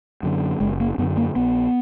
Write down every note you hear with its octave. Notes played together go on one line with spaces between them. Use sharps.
F#2 D3
F#1 G#3
A#3
F#2 D3 B3
A#3
A#1 B3